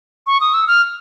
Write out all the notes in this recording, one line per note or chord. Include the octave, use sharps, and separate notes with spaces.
C#6
D#6
E6
F6